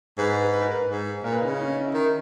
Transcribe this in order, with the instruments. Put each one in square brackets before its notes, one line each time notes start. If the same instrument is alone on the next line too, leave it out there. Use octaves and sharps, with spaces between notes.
[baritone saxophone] G#2 [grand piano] B4
[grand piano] B4
B4
B4
A#4
B4
[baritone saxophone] G#2
[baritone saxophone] A#2 [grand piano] A#4
[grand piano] B4
[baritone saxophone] C#3 [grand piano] D#4
[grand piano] C#4
D#4
C#4
D#4
E4
[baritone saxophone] D#3